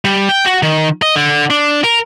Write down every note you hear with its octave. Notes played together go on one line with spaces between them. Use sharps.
G3
G5
F#4
D#3
D#5
D3
D4
A#4